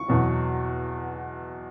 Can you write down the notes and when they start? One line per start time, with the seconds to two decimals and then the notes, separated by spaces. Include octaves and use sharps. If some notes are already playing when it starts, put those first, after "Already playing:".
Already playing: C#6
0.08 E2 B2 F#3